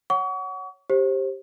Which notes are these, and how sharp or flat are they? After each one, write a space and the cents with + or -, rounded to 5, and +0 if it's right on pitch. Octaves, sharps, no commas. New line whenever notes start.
C#5 +0 F#5 +10 C#6 +35
G4 +0 C5 +25